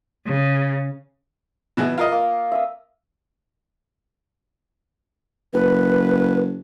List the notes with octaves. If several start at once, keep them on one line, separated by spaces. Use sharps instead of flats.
C#3
B2 E3 G#4
F4 A#4 D#5
A#3
E5 D#6 E6
F#1 B4